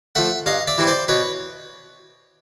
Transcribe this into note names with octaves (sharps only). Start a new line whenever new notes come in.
F3 A3 E5 F#5
G2 D#5 F5
D5 E5
E3 G3 C4 E4
C5 D5
B2 B4 C#5